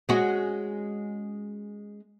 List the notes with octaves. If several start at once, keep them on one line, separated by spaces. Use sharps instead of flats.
G#3 C#4 F#4